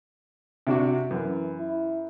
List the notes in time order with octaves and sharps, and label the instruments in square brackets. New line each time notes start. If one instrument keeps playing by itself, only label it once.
[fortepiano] C3 D4 F#4
[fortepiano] F#2 [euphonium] E3
[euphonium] E4